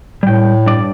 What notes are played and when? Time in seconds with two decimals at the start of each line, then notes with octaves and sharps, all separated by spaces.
0.23 A2 G3 G5
0.66 G2 D5